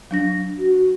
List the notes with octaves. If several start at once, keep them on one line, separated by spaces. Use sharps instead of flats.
F#3 D4 A#6
F#4